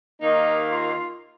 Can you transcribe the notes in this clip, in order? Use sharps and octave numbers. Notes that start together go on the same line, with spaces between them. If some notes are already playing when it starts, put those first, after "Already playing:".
D#2 D#3 A#3 D#4
F4